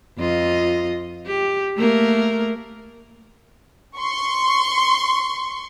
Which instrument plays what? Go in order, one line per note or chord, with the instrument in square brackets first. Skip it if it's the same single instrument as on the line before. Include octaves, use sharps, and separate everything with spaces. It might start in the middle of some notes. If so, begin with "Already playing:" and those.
[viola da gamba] F2 F4 D#5
G4
A3 A#3 A#4
[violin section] C6 C#6